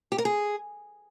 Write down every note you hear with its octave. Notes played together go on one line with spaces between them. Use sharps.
G4
A#4
G#4